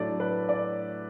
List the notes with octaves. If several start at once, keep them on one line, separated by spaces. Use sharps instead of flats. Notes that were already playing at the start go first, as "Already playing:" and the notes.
Already playing: A2 F#3 A3 D4 D5
B4
D5